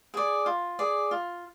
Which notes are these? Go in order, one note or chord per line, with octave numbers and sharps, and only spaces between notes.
G#4 D5
F4
G#4 D5
F4